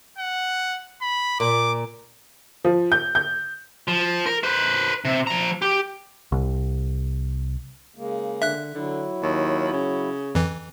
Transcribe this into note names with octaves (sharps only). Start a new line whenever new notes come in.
F#5
B5
A#2 D6
F3
G6
G6
F3
A#4
B4 C5
C3
F3 A#5
G4
C2
C#3 G#3 A#3
D3 E5 F#6
D3 F#3 E4
D#2
C#3
F2 E3